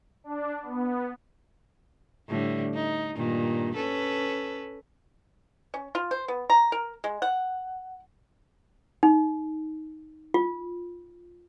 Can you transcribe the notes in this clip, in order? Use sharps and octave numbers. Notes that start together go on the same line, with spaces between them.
D4
B3
A2 D3 G3
D#4
G2 A#2 D#3
C#4 A4 B4
C#4
F4
C5
B3
A#5
A#4
G#3
F#5
D#4
F4